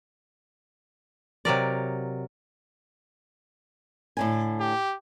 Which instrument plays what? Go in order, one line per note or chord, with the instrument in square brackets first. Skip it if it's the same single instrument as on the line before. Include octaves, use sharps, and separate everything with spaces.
[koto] C3 F#3 A#4 D5
[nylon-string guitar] A2 D3 G#5
[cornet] G4